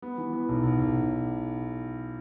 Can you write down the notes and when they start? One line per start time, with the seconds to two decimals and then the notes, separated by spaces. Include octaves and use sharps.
0.02 B3
0.18 E3
0.33 B3
0.49 B1
0.63 B1
0.79 B1